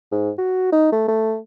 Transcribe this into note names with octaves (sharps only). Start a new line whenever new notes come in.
G#2
F#4
D#4
A3
A3